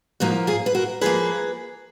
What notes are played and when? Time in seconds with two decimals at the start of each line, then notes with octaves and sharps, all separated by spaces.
0.20 G#2 F3 A#3 D#4 F#4
0.47 F4 G#4
0.66 B4
0.75 F#4 A#4
1.01 F3 A#3 G#4 B4